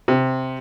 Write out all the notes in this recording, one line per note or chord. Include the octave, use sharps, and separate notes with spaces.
C3